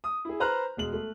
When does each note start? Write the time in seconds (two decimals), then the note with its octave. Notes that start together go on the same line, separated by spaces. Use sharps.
0.04 D#6
0.25 E4 G#4
0.40 B4 C5 A#5 F6 F#6
0.77 E1 G#3 F#7
0.93 A3